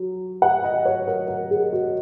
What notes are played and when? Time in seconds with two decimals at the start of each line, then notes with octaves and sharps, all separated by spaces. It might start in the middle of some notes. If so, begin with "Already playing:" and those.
Already playing: F#3
0.42 F#5
0.64 D#5
0.85 C#5
1.07 A#4
1.28 A#4
1.51 G#4
1.72 F#4